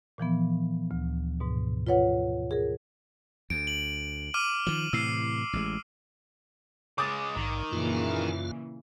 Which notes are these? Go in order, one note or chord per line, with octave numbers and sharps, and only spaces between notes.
A#2 E3 F3 B3
D2
G#2 B2
F4 B4 C#5 F#5
G#4 A#4
D2 D7
F#7
D6 F6 D#7
D#3 F3 F#7
A2 C3 E3 E6 C7
A1 G#3
C#3 G#3 D6 D#6 A6
A#1 G#2 D#3
F#2 A#2 C#3 E3 F4